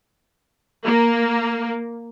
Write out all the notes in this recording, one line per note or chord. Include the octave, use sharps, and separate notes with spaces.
A#3